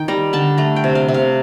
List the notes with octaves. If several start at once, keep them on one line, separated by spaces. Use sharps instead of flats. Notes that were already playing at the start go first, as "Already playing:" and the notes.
Already playing: D#3 D#4 G5
G3 A#5
D3 A5
A3 A#5
G5
C3
F5
C3
F5